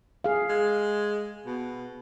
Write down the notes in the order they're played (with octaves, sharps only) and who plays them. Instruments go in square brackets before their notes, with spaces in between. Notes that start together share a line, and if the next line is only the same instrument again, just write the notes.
[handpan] G#4 F5
[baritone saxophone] G#3
B2